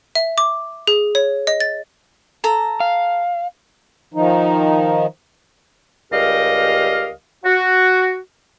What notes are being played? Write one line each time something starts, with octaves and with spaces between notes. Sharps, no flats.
E5
D6
G#4
C#5
D#5
A6
A4 A#5
F5
D#3 F3 D#4
C#2 G3 G4 A#4 D#5 F5
F#4